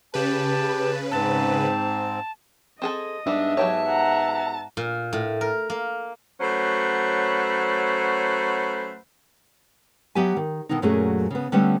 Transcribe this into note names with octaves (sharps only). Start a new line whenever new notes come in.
C#3 G4 B4 A5
G#2 C4 A5
C4 G#4 A4 D#5
G#2 G3 B3 D4 E5
F#3 G4 C#5 A5
F#5 A#5
A#2
A2
A#4
A#3
F#3 A3 C#4 B4 C5 F#5
F#3 B3 G4 E5 G#5
D#3
B2 D3 D#3 B3 D#4
F#2 A#2 F#3 A3 C#4 G#4
C#3 B3
D3 G3 A3 B3 C#4